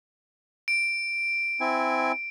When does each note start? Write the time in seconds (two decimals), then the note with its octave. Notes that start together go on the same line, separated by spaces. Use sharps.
0.68 D7
1.61 C4 E4 G#5